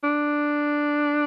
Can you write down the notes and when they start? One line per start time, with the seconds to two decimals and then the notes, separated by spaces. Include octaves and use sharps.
0.03 D4